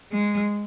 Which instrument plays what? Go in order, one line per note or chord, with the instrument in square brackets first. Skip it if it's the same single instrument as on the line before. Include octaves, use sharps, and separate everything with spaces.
[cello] G#3